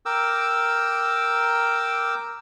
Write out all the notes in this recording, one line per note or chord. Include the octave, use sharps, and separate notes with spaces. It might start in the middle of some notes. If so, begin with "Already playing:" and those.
A#4 G5 D6 E6